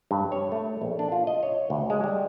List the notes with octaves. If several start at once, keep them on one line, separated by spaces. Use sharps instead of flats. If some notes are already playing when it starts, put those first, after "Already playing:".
G2
C#5
A3
A#1
D4
F4
D#5
C#5
D2
G#3
G3